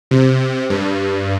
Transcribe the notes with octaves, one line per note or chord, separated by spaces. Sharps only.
C3
G2